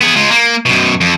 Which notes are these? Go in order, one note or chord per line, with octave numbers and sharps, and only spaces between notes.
B3 G#4
G#3 F4
A#3
F#2 B2
F2